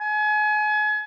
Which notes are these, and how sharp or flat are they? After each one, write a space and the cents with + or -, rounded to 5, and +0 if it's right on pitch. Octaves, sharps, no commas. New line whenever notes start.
G#5 +35